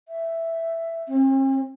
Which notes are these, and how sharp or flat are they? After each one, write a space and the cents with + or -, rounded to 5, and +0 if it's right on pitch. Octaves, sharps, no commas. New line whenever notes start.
E5 +5
C4 +45